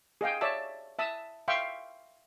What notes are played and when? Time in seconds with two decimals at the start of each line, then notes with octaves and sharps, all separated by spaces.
0.21 G#4 D#5 F5 G5
0.41 C#5 D5 E5 A5 E6
0.99 E5 A5 D#6 E6
1.48 E5 F5 G5 C6 C#6